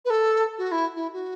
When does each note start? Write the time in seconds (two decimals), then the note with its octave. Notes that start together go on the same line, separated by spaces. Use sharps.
0.05 B4
0.10 A4
0.58 F#4
0.72 E4
0.96 E4
1.13 F#4